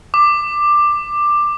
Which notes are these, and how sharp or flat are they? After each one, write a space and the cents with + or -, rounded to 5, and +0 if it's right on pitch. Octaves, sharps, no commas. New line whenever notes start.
D6 +10